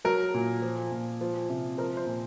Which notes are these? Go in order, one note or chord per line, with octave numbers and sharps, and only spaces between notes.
F#3 A#4
A#2
F3
A#2
F3
C3
F3 A#4
C5
A#2